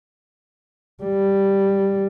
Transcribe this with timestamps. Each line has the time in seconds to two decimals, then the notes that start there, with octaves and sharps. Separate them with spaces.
1.04 G3